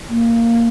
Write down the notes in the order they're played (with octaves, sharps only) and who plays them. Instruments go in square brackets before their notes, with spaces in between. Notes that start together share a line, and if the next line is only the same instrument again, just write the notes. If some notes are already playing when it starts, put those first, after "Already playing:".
[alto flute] A#3